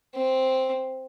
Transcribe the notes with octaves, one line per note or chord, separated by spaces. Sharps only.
C4